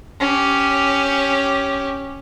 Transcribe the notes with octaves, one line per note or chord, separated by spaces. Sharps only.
C#4 G4